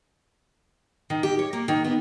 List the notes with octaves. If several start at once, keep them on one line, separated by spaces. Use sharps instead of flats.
D#3
G4
C#5
A#3
D#3
B3